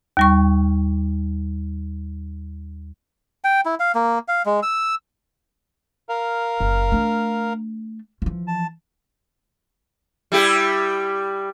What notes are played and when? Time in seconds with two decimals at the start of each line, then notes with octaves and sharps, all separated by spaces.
0.17 D#2 G3 C#6
3.44 G5
3.66 E4
3.80 F5
3.95 A#3
4.28 F5
4.46 G#3
4.63 E6
6.09 A#4 F5
6.60 F#1
6.92 A3 D4
8.22 E3 F3
8.47 A5
10.32 G3 E4 G4